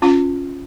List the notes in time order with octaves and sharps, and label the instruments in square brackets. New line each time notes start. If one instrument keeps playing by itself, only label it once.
[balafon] C#4 F4